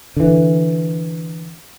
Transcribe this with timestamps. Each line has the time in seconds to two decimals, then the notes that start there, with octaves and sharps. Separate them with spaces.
0.17 D3 E3